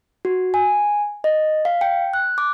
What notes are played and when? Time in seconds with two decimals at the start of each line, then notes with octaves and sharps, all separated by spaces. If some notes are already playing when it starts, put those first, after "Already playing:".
0.25 F#4
0.54 G#5
1.24 D#5
1.65 F5
1.81 G5
2.14 F#6
2.38 D6